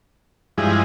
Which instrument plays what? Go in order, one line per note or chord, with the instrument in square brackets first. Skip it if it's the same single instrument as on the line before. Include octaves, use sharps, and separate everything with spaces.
[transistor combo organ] G2 F3 G#3 E4 G#4